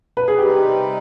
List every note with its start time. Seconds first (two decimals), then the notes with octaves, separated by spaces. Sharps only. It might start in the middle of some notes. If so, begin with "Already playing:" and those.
0.17 B4
0.28 G#4
0.38 C3 G3 C4 D#4 G4 B4